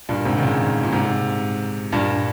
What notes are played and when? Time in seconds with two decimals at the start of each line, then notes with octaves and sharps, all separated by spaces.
0.09 G2 A#2
0.25 G#2 C3
0.37 D#3
0.42 A#2 C#3
0.83 A#2
0.92 G#2 C3
1.92 G2 A#2